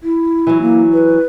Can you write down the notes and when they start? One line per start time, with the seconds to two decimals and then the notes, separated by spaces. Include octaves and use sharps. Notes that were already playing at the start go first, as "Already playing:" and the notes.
0.03 E4
0.47 E3 F#3
0.61 A#3
0.93 B4